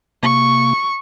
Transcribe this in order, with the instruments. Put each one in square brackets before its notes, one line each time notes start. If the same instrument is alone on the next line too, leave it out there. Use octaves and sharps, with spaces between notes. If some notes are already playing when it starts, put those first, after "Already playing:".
[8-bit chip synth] C3 A#3 [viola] C#6